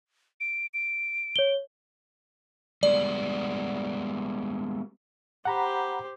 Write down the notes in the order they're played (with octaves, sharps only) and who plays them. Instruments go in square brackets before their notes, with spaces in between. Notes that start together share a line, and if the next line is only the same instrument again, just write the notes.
[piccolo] D7
D7
[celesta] C#5 G7
[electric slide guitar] G3 G#3 B3 [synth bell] D5
[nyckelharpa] G4 C5 [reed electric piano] F#5 A#5 B5